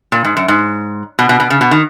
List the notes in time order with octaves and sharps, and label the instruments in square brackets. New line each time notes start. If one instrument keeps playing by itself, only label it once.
[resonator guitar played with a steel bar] A#2
G#2
F#2
G#2
B2
B2
B2
C#3
B2
D#3